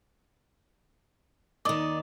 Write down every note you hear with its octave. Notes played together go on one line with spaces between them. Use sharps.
D#2 D#3 D5 D#5